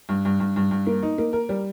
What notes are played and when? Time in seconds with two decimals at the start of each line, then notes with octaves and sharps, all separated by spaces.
0.09 G2
0.25 G2
0.40 G2
0.56 G2
0.71 G2
0.87 A#3
1.02 D#4
1.18 A#3
1.33 A#4
1.49 G3